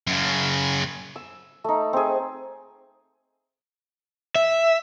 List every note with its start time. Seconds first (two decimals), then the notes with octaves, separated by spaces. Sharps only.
0.07 F#2 C#3
1.16 E6
1.64 A3 D#4
1.93 C4 G#4
4.35 E5